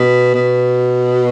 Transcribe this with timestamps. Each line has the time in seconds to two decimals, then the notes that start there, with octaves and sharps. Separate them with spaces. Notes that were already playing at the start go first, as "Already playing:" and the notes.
Already playing: B2
0.35 B2